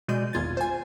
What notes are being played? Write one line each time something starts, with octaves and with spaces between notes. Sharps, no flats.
B2 G#3 D5 G6 D#7
G#1 E2 F4 G#6 A6
C5 G#5